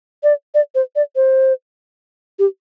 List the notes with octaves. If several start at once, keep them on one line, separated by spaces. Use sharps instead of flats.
D5
D5
C5
D5
C5
G4